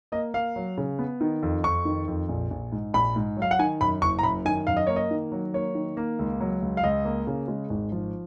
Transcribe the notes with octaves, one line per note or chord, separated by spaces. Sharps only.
A#3 D#5
A#3 F5
F#3
C#3
B3
D#3
F2
F2 C#6
D#3
F2
A#1
A#1
G#2
A#1 B5
G#2
F#3
F5
F#5
D#3 G#5
F#2 B5
F#1 C#6
A#5
F#2 B5
D#3 G#5
F#2 F5
D#5
A#3 C#5
D#5
D#3
F#3
A#3 C#5
D#3
A#3
C#2
F#3
C#2
F5
C#2 D#5
A#3
C#3
G#3
G#1
F3